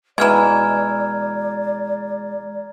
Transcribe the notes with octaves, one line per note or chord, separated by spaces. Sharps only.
B2 E3 G#3 D5 A#5 F6 G#6